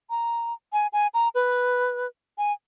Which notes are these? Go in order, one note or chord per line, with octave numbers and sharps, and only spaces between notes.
A#5
G#5
G#5
A#5
B4
G#5